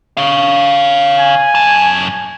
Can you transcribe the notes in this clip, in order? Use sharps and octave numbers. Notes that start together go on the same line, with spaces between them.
C#5 F5
G#5
F#2 A5